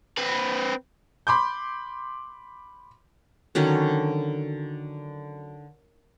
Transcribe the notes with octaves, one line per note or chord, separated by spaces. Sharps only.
C4 B4
B5 C6 D6 G6
D3 D#3 F#3 C#4